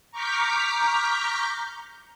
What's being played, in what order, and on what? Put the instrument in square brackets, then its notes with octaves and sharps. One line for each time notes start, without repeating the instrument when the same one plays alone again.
[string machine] A#5 C#6 D6 F6 G6 B6